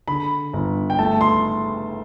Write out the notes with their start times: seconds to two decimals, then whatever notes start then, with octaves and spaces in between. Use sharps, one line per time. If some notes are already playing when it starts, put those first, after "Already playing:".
0.08 D3 B5
0.53 G1
0.90 G5
0.99 A3 A5
1.21 C6